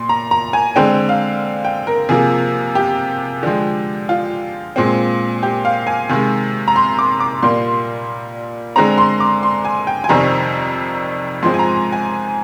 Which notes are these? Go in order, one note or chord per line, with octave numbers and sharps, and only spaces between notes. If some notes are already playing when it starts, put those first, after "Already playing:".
Already playing: A#2 C6
A#5
A#5
G#5
D3 G#3 C4 G5
F5
G5
A#4
C3 F3 A#3 G#4
G4
D3 F3 G#3
F4
A#2 G#3 C4
G4
F5
G#5
C3 D#3 G#3
A#5
C6
D6
D6
A#2 G3 A#3 C6
D3 G#3 C4 A#5
C6
D6
C6
G#5
G5
G#5
F2 C3 D#3 G3 C4 A#5
G#2 F3 G#3 C4 C6
G#5
A#5
G#5